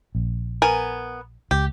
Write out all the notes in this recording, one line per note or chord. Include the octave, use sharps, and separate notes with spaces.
A#1
B3 A#4 G#5
C#2 G4